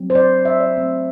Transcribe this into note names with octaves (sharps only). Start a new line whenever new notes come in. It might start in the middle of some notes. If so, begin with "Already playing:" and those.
Already playing: F#3 C4
C5
D5
E5
D5
F#3 A3 C4